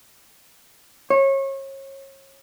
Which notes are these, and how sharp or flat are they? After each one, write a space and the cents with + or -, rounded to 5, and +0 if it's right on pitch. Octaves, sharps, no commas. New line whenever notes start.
C#5 -30